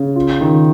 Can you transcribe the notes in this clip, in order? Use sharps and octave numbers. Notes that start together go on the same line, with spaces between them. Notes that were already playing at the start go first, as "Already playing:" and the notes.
Already playing: C#3
F4
D#3